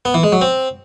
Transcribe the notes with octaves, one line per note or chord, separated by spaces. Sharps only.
B3
E3
G#3
F#3
C4